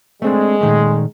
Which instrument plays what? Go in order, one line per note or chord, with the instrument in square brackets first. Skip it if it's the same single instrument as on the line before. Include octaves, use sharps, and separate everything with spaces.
[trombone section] G#3 [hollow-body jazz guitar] A3 C4 D4
[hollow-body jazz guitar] A#2 D#3 A3